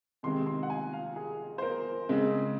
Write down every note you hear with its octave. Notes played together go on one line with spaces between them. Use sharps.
C3 D#3 G#3 C4 C6
C6
F#5
G#5
F5
G#4
C5
A#4
C#3 G#3 C4